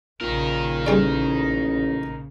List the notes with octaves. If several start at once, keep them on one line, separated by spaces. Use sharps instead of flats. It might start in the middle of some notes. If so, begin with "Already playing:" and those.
A#1 A#2 C#3 A#3 D#4 A#4
A1 G3 G#4 D5